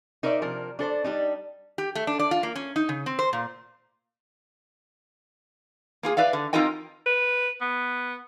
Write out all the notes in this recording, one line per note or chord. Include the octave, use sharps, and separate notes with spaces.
D#4 A#4 C5 D5 E5
C3 F3 D4 A#4
D4 A4 C5 D5
G3 D4 D#4
G4
A3
D4
D5
F4
A#3
C#4
D#4
C#3
C4
C5
A#2
A#3 F4 G#4
B4 D5 E5 F5
D3
C4 D#4 F4 A#4 D#5 G5
B4
B3